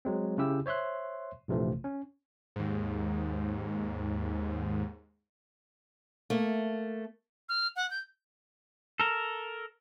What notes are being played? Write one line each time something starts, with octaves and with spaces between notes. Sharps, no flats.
F#3 G#3 C4
C#3 C#4 E4 G4 E6
C5 C#5 E5 C6 F#6
A#1 F2 C3 E3 F3 A3
C#4
D#2 G#2
A3 A#3
F6
F#5
G6
A4 A#4